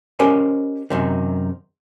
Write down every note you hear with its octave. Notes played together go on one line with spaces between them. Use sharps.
C#4 G4 A#4 C5 D#5
F#2 C3 D#3